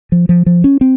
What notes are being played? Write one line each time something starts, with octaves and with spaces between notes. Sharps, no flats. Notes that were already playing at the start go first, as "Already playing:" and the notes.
F3
F3
F3
C#4
C4